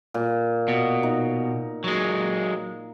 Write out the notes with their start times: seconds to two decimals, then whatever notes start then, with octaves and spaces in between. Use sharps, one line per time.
0.14 A#2
0.68 B2
1.03 D#4
1.84 F#3 G#3